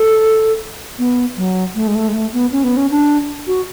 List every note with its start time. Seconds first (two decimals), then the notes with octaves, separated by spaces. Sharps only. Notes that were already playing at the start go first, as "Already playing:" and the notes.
Already playing: A4
0.99 B3
1.37 F#3
1.75 A3
1.87 G#3
1.95 A3
2.08 G#3
2.14 A3
2.33 B3
2.52 C#4
2.64 B3
2.77 C#4
2.91 D4
3.47 F#4